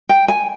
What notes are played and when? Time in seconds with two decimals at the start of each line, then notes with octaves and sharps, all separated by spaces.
0.09 G5
0.28 G#5